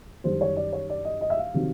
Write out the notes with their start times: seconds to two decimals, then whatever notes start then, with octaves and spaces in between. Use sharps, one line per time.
0.24 F#2 D#3 G3 C5
0.41 C#5
0.56 D5
0.73 C#5
0.89 D5
1.05 D#5
1.21 D#5
1.30 E5
1.37 F5
1.54 C3 D#3 F#3